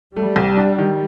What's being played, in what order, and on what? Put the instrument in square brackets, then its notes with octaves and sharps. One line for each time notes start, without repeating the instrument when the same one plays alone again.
[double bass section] G3 [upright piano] A3
[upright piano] C2
D4
D#3